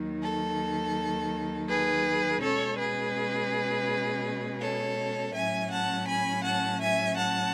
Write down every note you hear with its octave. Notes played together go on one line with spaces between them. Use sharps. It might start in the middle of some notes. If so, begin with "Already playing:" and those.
Already playing: D#2 D#3 F#3
A4
G#4 B4
B2 G#3 C#4 A4 C#5
G#4 B4
A4 C#5
A2 F#3 C#4 E5 G#5
F#5 A5
G#5 B5
F#5 A5
E5 G#5
F#5 A5